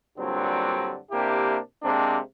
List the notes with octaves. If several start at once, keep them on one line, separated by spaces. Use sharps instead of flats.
G2 A#2 D3 F#3 G3 C4
C3 A#3 D4 E4 G4
C3 G#3 A#3 C4 D4